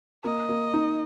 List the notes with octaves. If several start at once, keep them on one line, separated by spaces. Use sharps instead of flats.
A#3 D#5
A#3
D#4